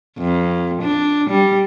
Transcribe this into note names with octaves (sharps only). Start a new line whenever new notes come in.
F2
D4
G3